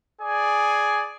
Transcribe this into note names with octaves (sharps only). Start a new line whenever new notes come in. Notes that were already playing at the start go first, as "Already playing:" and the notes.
G#4 D5 G#5